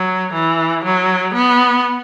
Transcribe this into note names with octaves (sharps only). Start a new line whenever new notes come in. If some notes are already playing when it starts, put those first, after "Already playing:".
Already playing: F#3
E3
F#3
B3